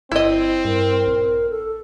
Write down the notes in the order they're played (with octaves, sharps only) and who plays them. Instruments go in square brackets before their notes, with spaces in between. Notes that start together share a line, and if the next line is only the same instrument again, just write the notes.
[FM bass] G1 [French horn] C4 [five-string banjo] E4 D#5
[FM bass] G2 [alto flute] A#4
[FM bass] A#1
[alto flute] A4